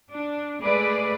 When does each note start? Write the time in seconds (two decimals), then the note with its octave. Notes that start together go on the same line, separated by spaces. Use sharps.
0.11 D4
0.62 G#3 A3 G#4 B4 D5